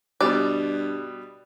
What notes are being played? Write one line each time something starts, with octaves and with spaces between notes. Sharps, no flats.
G2 B2 G3 D5 F#6